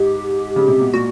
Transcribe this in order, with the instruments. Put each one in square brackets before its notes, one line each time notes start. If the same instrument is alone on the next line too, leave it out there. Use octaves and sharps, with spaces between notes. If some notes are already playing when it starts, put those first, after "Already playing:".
Already playing: [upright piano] G#2 [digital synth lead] G4
[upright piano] C#3
C3
B2
[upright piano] A#2 [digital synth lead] F#4